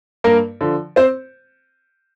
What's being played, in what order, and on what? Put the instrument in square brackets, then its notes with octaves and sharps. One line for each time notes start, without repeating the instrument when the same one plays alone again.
[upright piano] G2 A#3 A#4
D3 F3
C4 C5